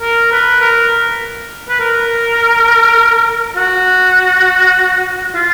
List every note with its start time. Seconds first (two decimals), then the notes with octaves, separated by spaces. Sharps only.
0.01 A#4
0.32 B4
0.62 A#4
1.69 B4
1.80 A#4
3.56 F#4
5.35 F4